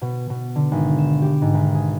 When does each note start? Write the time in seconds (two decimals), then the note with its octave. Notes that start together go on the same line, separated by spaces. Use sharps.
0.01 B2
0.30 B2
0.55 D3
0.72 G#1
0.99 E7
1.22 G4
1.42 G#2
1.54 G#1
1.75 G#4